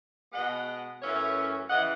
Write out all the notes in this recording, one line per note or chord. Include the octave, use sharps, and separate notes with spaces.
B2 G#3 B3 D#5 F#5
F#2 E3 A3 C#4 C#5 E5
C#3 E3 D#5 F#5